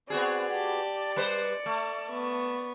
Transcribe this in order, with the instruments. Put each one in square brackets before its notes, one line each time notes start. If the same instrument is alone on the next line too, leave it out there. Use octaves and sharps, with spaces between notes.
[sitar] B3 F#4 G#4 [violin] C4 [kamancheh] D5
[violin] G4 A5
[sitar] G3 B4 C5 [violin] C#7
[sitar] A3
[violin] B3 C#6